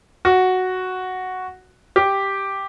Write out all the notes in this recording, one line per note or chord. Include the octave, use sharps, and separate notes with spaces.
F#4
G4